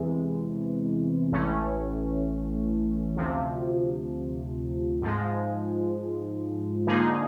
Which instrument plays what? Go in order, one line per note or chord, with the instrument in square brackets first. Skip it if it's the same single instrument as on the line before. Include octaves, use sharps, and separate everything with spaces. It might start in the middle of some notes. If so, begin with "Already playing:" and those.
Already playing: [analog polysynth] E2 C3 E3 G#3
A1 A2 E3 A3 C#4
D2 C3 F3
G#2 F3 G#3
D3 F3 A#3 D#4 G#4